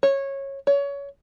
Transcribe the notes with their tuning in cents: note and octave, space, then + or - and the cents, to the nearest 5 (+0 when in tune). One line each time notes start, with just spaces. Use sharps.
C#5 -15
C#5 +25